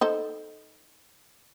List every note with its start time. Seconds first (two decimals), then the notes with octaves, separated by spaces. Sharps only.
0.01 D#4 A4 C5